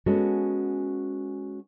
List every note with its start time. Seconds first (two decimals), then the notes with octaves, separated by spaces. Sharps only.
0.06 G#3 B3 C#4 F#4 A4